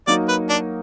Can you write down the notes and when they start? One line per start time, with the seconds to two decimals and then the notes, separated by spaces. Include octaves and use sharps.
0.07 F#3 A#3 D#4 F#4 A#4 D5
0.28 B4
0.49 D4